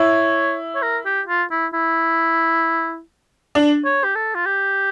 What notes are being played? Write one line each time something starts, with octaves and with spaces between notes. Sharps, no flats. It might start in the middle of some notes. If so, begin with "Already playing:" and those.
Already playing: E4 C#5
C#5
A#4
G4
F4
E4
E4
D4
C#5
G4
A4
F4
G4